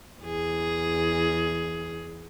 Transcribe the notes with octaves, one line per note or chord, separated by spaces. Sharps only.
E2 G#4